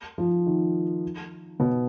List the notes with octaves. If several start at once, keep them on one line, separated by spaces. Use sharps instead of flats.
F3
D#3
B2